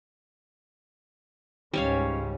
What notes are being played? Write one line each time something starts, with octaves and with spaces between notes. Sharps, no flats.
C#2 G#2 G3 C#4 C#5 F5